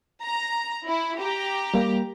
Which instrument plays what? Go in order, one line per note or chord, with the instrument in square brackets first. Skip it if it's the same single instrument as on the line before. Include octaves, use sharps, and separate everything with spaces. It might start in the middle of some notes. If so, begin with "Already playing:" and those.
[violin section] A#5
E4
G4 A#5
[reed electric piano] G3 A#3